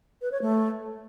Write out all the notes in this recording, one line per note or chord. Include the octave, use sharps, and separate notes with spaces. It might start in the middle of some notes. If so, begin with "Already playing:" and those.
B4
C#5
A3